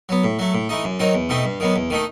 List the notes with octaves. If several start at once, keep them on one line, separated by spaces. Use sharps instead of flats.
F#3 B3
A2
F#3 A3
A2
E3 A3 D#4
F#2
D#3 F#3 C4 D#4
E2
B2 A3 C4 D#4
G2
D#3 F#3 B3
E2
D#3 A3 D#4